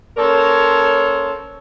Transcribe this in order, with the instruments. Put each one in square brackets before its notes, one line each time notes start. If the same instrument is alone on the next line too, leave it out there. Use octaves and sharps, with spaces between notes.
[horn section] A#3 C#4 A4 A#4 C5 C#5